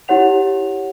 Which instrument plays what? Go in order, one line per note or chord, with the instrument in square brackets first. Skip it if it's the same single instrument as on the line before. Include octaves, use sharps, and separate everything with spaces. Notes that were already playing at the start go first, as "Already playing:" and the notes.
[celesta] E4 G4 C#5 F#5 F7